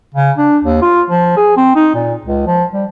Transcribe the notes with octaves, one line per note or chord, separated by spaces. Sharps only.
C#3
D4
D#2
F4
F3
G#4
C4
D#4
A#2
C#2
F3
G3